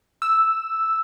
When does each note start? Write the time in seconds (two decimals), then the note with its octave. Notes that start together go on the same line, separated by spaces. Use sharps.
0.22 E6